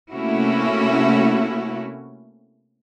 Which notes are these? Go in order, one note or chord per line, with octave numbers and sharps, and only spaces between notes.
C3 A3 A#3 C#4 E4 F#4